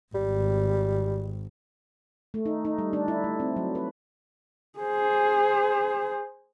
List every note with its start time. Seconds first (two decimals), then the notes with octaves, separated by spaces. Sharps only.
0.15 G#1 G3
2.34 A3
2.46 D#4
2.65 D#4
2.78 G3
2.93 D4
3.08 E4
3.24 A3
3.40 C4
3.56 F#3
3.75 B4
4.79 G#4 C5